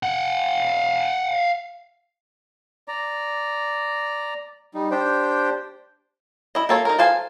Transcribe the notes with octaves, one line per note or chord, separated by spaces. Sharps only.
F5 F#5
D5 A#5
G3 D#4
D4 G4 C5 G5
E4 D#5
A#3 A4 C#5
D#4 A#4
A4 C5 F5 G#5